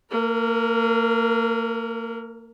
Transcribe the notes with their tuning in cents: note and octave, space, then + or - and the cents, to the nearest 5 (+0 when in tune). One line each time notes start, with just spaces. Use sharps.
A#3 -35 A#4 +20